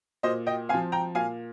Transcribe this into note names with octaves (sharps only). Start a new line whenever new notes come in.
A#2 C5 D#5
D#5 G5
F3 C4 F5 G#5
G5 A#5
A#2 F5 G#5